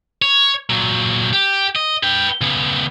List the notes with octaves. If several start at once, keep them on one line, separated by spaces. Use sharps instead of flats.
C#5
A#2 F#3
G4
D#5
B4 G5
C#3 B3